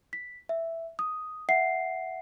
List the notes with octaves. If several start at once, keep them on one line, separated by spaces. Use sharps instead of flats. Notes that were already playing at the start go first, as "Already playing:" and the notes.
B6
E5
D#6
E5 F#5 C7